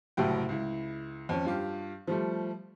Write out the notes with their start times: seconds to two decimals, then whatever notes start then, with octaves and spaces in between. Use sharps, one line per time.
0.17 F#1 C2 A2 F#3 G5
0.49 C#2 E4
1.29 F2 C#4
1.45 G2 F4 G4
2.07 F3 G3 A3